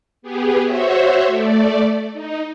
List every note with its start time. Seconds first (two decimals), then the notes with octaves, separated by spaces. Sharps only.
0.22 B3 G4 G#4
0.64 F#4 C5 C#5 E5
1.26 A3 D5
2.13 D#4